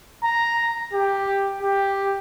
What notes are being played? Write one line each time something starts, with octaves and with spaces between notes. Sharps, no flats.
A#5
G4
G4